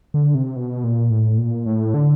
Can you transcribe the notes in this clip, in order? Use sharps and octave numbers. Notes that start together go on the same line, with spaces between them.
D3
C3
B2
A#2
A2
A#2
A2
D3